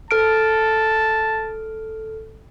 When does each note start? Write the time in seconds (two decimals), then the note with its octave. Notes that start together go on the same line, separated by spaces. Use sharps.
0.11 A4 A5 F6 D7